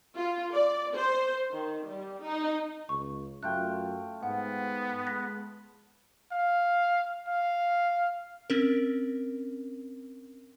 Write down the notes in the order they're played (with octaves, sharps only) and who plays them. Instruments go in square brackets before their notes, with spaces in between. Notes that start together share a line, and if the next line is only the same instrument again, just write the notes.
[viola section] F4
D5
C5
D#3
G3
D#4
[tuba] C#2 [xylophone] C#6
[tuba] F#2 [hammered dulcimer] A3 F4 G5 [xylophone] F#6
[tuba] G#2 [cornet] B3 [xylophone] F#5
[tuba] G#3 [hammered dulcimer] B5 [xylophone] F#6 A#6 B6
[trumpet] F5
F5
[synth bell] C4 C#4 A#4